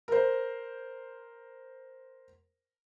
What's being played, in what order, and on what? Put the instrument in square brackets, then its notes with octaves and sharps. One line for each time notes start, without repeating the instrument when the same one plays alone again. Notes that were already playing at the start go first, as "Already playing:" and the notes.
[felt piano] A#4 C5